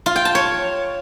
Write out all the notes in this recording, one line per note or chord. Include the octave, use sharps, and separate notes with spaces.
F4
G5
A5
C#5